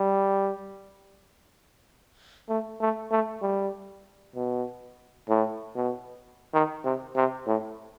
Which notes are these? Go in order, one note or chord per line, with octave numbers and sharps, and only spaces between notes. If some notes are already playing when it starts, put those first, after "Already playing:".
Already playing: G3
A3
A3
A3
G3
B2
A2
B2
D#3
C3
C3
A2